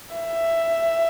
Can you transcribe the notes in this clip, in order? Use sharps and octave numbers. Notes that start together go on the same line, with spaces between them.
E5